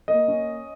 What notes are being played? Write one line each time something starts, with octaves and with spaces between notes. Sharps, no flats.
A#3 D#5
C#4